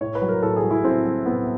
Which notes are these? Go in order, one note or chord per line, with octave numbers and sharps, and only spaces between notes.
A2 C#5
B4
F#3
A#4
A2 A4
G#4
F#3
E4
A2 C4
F#3
A2 B3